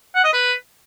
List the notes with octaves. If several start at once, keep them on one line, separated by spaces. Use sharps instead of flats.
F#5
D#5
B4